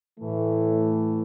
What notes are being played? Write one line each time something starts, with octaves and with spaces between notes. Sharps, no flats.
A2 E3 A3